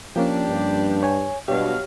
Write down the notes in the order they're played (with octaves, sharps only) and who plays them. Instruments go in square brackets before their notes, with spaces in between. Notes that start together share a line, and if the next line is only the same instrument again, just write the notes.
[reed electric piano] F3 A#3 C#4 [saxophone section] D4 G4
[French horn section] G2
[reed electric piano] C#5 G#5
[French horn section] G2 B2 [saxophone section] F#3 F5 [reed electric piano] G4 C#5